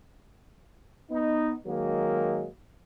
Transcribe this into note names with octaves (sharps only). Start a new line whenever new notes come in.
B3 D#4
D#3 F#3 G#3 A#3